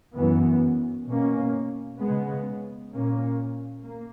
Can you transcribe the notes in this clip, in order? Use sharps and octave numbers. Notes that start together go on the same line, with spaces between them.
F#2 E3 B3
B2 A#3 C#4
C#3 G#3 B3
A#2 A#3 C#4
A#3